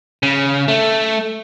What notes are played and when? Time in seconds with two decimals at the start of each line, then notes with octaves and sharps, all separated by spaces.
0.23 C#3
0.68 A3